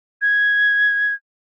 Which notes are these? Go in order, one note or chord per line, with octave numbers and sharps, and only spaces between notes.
G#6